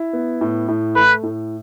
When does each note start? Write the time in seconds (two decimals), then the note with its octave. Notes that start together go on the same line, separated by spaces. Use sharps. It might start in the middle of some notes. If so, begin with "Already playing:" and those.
Already playing: E4
0.13 B3
0.41 A2
0.68 A2
0.96 A3 B4
1.23 A2